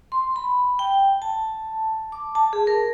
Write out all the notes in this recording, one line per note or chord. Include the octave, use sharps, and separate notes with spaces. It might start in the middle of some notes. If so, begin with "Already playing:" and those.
C6
B5
G5
A5
D6
A5
G#4
A#4